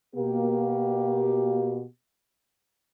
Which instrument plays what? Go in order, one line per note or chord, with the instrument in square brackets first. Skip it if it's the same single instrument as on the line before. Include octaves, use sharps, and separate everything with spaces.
[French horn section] B2 A#3 G4